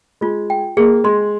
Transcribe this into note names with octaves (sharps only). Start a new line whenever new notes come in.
G#3 F4
G5
A#3 G#4
G#3 C6